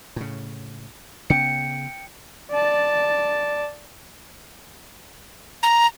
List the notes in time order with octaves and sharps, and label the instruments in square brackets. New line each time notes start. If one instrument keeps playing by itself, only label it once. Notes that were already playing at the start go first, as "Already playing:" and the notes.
[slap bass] A2 C#3
[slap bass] C#3 B3 [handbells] G5 C#7
[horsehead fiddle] D5 A5
[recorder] A#5